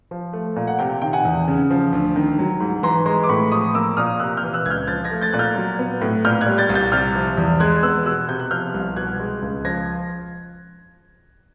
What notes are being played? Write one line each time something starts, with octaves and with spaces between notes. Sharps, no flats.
F3
A3
A#2
F#5
C3 F5 G5
D#3 G5
F#5 G#5
E2
C#3
F3
D2
D#3
F#3
G#2
E3 A#5 C6
G#3 A#5 C6
D6
A2 B5 C#6
F3 C#6 D#6
A#3 D6 E6
A#2 D#6 F6
C3 E6 F#6
F6 G6
E3
E6 F#6
C#2 F6 G6 G#6
F3 G6 A6
G#6 A#6
A3
G6 A6
A#2 F#6
F6 G6
F#3
B3
A2
A#2 F6 G6
F#6 G#6
G3
G6 A6
C2
G6 A6
C3 F6 G6
F3
E2
G#3 F#6 G#6
B3 E6 F#6
B2 E6 F#6
C3 G6
F#6
F3 F6 G6
C2
B2 F#6 G#6
G#3
C#2
F3 G#6 A#6